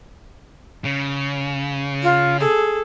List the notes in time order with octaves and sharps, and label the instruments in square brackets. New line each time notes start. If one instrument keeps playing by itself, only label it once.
[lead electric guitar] C#3
[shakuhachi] F4
[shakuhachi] G#4 [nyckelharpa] A4